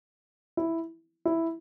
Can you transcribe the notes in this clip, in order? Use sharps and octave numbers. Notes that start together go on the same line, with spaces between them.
E4
E4